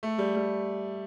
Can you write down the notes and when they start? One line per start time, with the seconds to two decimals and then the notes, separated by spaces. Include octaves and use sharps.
0.03 A3
0.18 G3
0.36 G3